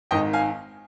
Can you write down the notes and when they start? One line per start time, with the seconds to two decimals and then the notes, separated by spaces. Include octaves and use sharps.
0.11 G#1 G#2 D#3 D#5 G5
0.33 F5 G#5